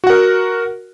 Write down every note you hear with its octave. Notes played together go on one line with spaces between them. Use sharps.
F#4 A#4 F#5